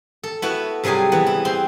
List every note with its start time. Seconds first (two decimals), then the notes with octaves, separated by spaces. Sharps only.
0.23 A4
0.42 B3 E4 F#4
0.84 C3 F#3 G3 G#4 G#5
1.12 E3 B3
1.26 E4
1.45 C4 C6